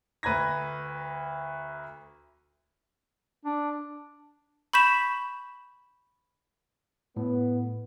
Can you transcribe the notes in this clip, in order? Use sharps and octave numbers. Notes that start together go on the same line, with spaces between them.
D2 B4 A#5 G#6 A#6
D4
B5 C#6 G6 B6 E7 F#7
A2 B3